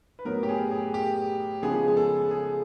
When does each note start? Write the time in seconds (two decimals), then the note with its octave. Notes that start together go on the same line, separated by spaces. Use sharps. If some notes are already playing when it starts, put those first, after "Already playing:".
0.19 B4
0.25 A2 F#3 B3 A#4
0.43 G4
0.49 G#4
0.71 G#4
0.94 G4
1.62 C#3 F3 G#3 B3 G#4
1.88 G#4
1.97 A4
2.31 G#4